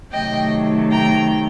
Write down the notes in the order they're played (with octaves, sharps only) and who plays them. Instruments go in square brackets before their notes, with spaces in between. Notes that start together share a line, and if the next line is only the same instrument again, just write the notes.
[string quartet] C3 D#3 F#3 A3 D#5 G5
G5 A#5